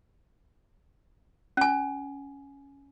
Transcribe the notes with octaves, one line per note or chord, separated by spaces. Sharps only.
C#4 G#5